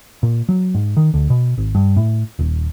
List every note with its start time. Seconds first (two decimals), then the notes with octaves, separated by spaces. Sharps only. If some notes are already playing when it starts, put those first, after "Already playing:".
0.23 A#2
0.49 F#3
0.75 G#2
0.97 D#3
1.14 D2
1.30 B2
1.58 G#1
1.75 G2
1.97 A2
2.39 D#1